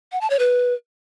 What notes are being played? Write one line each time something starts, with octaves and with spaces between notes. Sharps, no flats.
F#5
A5
C#5
B4